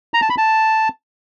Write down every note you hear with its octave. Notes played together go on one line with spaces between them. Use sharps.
A#5
A5
B5
A5